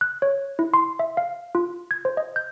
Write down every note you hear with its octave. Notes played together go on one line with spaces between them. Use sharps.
F#6
C#5
E4
C6
E5
F5
F4
G#6
C5
D#5
G6